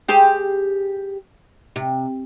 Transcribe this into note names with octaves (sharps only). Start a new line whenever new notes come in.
G4 G#4 C5
C3